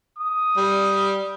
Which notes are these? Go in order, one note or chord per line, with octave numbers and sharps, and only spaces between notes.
D#6
G3